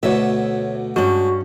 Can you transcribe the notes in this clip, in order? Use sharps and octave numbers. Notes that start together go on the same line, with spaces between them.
D2 B2 D3 C#5 E5
G2 G#3 C#4 F#4